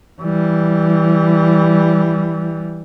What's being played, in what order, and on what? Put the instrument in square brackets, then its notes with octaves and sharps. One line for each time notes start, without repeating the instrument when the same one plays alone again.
[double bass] E3 G3